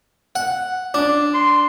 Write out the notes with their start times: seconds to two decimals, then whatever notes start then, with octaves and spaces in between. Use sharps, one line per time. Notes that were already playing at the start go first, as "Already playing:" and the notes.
0.36 F#5
0.94 D4
1.34 C6